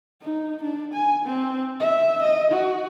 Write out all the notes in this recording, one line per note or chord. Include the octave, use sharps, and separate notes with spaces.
D#4
D4
G#5
C4
E5
D#5
F#4